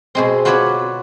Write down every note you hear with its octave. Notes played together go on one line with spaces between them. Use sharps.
B2 G#3 C4
F4 F#4 B4 C#5 D5 E5